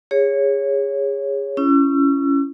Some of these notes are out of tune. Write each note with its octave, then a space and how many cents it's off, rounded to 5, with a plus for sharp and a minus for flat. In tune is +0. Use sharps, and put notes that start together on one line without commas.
G#4 -25 C#5 +0
C#4 +5 E4 +35 E6 +40